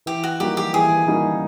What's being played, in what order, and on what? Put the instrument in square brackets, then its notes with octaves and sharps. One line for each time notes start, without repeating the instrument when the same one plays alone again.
[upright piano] E3 [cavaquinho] G4
[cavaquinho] F#4
[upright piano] G3 A#3 D#4 F#4 [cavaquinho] G4
[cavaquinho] G4
[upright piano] E3 [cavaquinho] G#4
[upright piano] G3 A#3 D#4 F#4